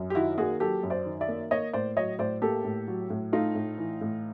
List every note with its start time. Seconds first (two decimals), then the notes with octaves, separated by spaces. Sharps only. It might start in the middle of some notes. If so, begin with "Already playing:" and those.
Already playing: F#2
0.10 G4
0.15 D#3 E4 F#4
0.38 A#3 F#4 G#4
0.60 F#3 G4 A4
0.83 F#2
0.90 C5 D5
1.06 D#3
1.21 D5 E5
1.28 A#3
1.51 A#3 C#5 D#5
1.73 A2 C5 D5
1.96 F#3 C#5 D#5
2.19 A2 C5 D5
2.42 A#3 G4 A4
2.64 A2
2.88 F#3
3.10 A2
3.32 A3 D#4 F4
3.55 A2
3.78 E3
4.01 A2